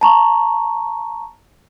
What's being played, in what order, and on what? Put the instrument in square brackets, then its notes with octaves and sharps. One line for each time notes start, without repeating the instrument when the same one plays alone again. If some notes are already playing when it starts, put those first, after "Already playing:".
[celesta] A5 A#5 C#6